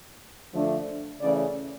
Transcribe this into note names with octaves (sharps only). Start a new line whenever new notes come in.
D3 F3 A3 D4
C#3 E3 A3 C#4 D5